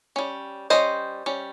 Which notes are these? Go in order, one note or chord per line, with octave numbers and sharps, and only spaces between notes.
G3 C#4
G3 C#4 C5 D#5
G3 C#4